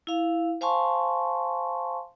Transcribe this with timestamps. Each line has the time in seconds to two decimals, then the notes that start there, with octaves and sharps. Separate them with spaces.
0.07 E4 F5
0.61 C5 F5 G#5 A5 C6 C#6